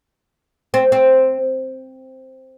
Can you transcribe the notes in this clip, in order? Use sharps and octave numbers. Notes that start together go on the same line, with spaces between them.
C4
C4